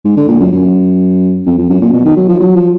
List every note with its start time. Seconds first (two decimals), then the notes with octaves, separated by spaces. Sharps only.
0.04 G#2
0.17 D3
0.28 A#2
0.40 F#2
0.52 F#2
1.46 F2
1.58 F2
1.69 F#2
1.81 A#2
1.93 B2
2.05 D#3
2.16 F#3
2.29 F3
2.40 F#3
2.56 F3